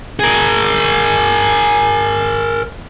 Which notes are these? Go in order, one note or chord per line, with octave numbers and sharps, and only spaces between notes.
G#4 A#4